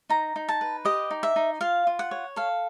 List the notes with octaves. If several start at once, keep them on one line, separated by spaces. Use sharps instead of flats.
D#4 A#5
D#4
A5
B4
G4 D#5
D#4
E5
D#4
F4 F5
F4
F#5
C#5
A4 F5